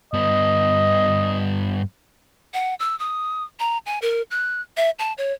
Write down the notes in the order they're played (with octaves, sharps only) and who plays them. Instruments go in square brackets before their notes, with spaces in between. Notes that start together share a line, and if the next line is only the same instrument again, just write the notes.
[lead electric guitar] G2 B3 [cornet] D#5
[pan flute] F#5
E6
D#6
A#5
G#5
A#4
F#6
E5
A5
C#5